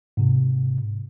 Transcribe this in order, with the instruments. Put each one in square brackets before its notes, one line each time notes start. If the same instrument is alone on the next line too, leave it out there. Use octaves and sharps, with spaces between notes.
[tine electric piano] G#2 C3